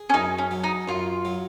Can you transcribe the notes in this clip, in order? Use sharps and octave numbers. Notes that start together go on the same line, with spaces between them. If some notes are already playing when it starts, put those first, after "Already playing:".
Already playing: G#4
C#4
F#2 D#4
C#4
F#3
D#4
F#2 F4
F#3